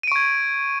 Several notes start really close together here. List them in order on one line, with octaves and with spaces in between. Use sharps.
D#7 D7 C#6 G#6